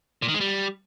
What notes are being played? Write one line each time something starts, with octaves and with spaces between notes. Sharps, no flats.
A#2
D#3
G#3
G3